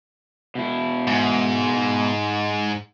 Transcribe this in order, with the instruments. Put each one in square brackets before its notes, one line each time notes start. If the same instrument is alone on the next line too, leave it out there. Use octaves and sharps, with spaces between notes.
[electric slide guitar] B2 E4
[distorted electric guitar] G#2